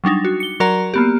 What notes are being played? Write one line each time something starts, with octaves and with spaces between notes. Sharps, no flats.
F#3 G3 D4 D#4
F#4
C#7 G7
F#3 F#4 A#4 D5 A#5
A#3 B3 G4